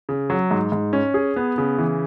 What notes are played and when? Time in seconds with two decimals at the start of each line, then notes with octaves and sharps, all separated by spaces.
0.09 C#3
0.30 F#3
0.51 G#2
0.72 G#2
0.93 C#4
1.14 G#4
1.36 B3
1.58 C#3
1.78 E3